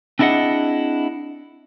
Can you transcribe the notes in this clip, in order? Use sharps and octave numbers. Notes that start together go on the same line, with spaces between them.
C4 D4 E4 G#4 D#5 F#5